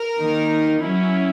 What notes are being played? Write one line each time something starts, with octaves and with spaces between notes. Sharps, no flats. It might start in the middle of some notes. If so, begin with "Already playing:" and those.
Already playing: A#4
D#3 A#3 D#4
F#3 C#4 E4